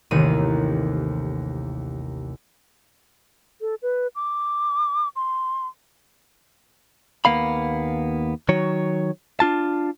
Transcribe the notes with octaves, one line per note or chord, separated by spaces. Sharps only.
A1 D#2 C3 D#3 D#7
A4
B4
D6
C6
D#2 A#3 B3 F5 B5
D#3 F#3 C#5
D4 F4 A5